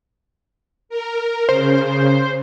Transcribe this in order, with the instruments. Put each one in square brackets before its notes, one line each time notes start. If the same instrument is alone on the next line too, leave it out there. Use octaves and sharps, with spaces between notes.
[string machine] A#4
[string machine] C#3 [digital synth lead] C5